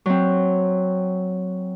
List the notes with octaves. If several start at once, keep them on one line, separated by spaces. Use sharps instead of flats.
F#3 C4